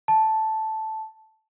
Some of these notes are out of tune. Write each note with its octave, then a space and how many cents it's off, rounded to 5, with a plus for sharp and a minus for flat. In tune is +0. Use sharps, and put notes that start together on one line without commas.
A5 -5